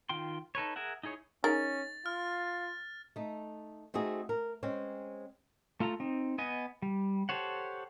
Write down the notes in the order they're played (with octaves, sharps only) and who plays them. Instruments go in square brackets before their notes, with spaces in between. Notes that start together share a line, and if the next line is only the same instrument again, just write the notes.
[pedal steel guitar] D#3 F4 G5 C6
D#4 A4 B4 C#5
G#4 A#4 E5 F#5
D#4 E4 G#4 C#5
[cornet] C#4 [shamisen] D#4 G#4 A#4 [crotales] A6
[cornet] F4 [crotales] F6
[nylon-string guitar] A3 D#4
A3 C4 D#4 F#4 G#4
A#4
G#3 C4 C#4
[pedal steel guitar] A3 F4 A4 A#5
C4 D#4
B3 D#5 G#5
G3
G4 A4 C5 C#5 F#5